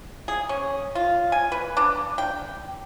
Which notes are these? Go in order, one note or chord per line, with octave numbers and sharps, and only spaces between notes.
G#4
C#4
F4
G#5
B4
D4
G5